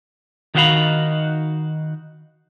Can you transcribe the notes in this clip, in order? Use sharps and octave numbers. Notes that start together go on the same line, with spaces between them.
D#3 D#4 F#4 C5 F5 B5